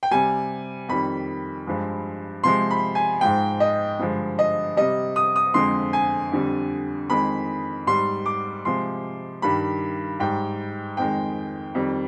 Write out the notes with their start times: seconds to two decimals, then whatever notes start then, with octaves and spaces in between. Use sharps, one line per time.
0.03 G5
0.11 C3 G3 G#5
0.88 F2 D#3 G3 B5
1.67 G2 F3 G#3
2.43 C3 F3 G#3 C6
2.70 B5
2.95 G#5
3.21 G#2 F3 G#3 G5
3.60 D#5
3.99 G2 D3 F3 G#3
4.39 D#5
4.77 C3 G3 D#5
5.16 D#6
5.36 D#6
5.54 F2 D3 F3 G#3 C6
5.93 G#5
6.32 F2 D3 G3
7.10 F2 D#3 G#3 B5
7.87 G#2 G3 C6
8.26 D6
8.65 C3 F3 G#3 C6
9.42 G2 D#3 G3 B5
10.20 G#2 G3 G5
10.97 F2 D#3 G#3 G5
11.75 F2 D#3 G3